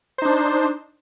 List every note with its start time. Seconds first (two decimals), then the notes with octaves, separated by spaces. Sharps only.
0.18 C5
0.22 D#4
0.25 D4